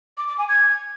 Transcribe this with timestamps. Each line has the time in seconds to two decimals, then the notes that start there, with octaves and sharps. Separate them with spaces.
0.18 D6
0.28 D6
0.38 G#5
0.49 G#6